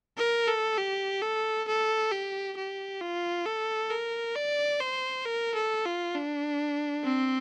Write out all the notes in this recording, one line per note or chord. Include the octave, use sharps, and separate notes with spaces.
A#4
A4
G4
A4
A4
G4
G4
F4
A4
A#4
D5
C5
A#4
A4
F4
D4
C4